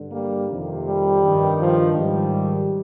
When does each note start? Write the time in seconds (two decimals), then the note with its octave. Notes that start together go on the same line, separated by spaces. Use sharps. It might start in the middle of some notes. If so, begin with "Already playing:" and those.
Already playing: G2 D3
0.11 G3 A#3
0.49 F2 C3 D#3
0.85 G3
1.22 G2 D#3
1.59 F3
1.95 G#2 D#3 G3